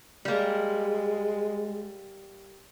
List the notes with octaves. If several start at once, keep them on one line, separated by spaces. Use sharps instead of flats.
G3 G#3 A#3